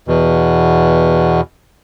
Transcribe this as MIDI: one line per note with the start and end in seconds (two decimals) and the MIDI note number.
0.08 1.41 40
0.08 1.41 47